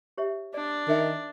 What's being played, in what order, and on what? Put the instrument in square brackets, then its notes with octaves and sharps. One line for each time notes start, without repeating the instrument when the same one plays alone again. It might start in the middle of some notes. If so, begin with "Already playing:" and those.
[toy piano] G4 C#5 E5
[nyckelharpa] D4 [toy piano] D5
[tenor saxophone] D#3 [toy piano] A#4 E5 G5